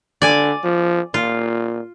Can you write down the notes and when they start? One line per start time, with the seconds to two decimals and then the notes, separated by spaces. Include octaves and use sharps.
0.22 D3 D5 G#5
0.63 F3
1.14 A#2 F4